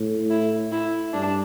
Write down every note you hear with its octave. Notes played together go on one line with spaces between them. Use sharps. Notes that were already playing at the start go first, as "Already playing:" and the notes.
Already playing: A2
E4
E4
G2 D4